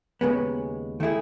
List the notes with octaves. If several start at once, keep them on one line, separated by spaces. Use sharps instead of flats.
D#2 C#3 G#3 B3
D#3 A3 E4 G#4